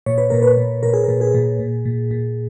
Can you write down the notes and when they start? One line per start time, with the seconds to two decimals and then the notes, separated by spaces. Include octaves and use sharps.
0.06 A#2 C#5
0.18 B4
0.30 A#2 A#4
0.42 B4
0.57 A#2
0.83 A#2 A#4
0.93 G#4
1.04 A#2 A#4
1.21 G#4
1.34 A#2
1.59 A#2
1.85 A#2
2.11 A#2